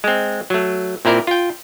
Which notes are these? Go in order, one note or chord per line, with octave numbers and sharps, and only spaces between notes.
G#3 C4
F#3 A3
A#2 C4 E4 A#4 D5
F4 G5